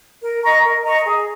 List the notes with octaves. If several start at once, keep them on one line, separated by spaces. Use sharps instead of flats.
A#4
D#5 A#5 C#6
A#4
D#5 A#5 C#6
G#4